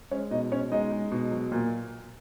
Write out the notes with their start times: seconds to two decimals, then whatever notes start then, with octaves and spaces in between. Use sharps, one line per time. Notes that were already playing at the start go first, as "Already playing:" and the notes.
0.11 G#3 C#4 C#5
0.31 B2 D#4 D#5
0.52 B2 C#4 C#5
0.71 G#3 D#4 D#5
0.92 G#3
1.12 B2
1.31 F#3
1.52 A#2